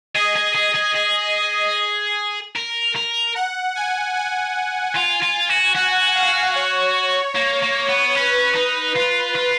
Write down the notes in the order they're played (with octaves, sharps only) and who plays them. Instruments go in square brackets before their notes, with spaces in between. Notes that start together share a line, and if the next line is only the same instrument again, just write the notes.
[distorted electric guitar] G#4 [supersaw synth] D#5
[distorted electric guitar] G#4
G#4
G#4
G#4
A#4
A#4
[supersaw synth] F#5
G#5
G#5
[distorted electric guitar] F4
F4
F#4
[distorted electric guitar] F#4 [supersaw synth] F#5
[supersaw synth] F5
C#5
[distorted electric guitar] A#3
A#3
B3
[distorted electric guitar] C#4 [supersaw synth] B4
[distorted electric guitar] D#4
F4
F4